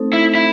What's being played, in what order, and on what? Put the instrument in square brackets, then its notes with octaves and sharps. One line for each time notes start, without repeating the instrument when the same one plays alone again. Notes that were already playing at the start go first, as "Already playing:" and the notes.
Already playing: [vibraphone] A3 C4 D#4 A4 C5
[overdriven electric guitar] E4
E4